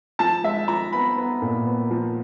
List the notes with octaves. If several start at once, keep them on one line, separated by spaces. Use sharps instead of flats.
F3 A5
G#3 E5
F3 A#5
B3 B5
B3
A#2
B3
F3